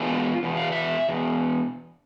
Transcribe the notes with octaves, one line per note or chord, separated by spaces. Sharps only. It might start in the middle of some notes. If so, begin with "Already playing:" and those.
Already playing: E2 B2 G#3 D4 F4
E2 B2
F5
E5
E2 B2